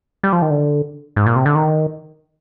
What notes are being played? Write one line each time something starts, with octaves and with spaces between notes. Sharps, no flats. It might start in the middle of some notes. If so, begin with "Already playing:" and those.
G3
F3
D#3
D3
G#2
A#2
C3
D3
D#3